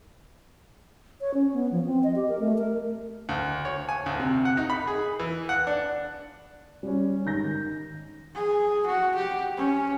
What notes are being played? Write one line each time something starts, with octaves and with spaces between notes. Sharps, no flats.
C#5
C#4
B3
F3
C4
D#5
G4
A#4
A3
A#4
D2
C#5
G#5
D2
C3
F#5
D#4
B5
G#4
E3
F#5
D4
G3 C#4
G#2 D#3 G6 A#6
G#4
F#4
G4
C#4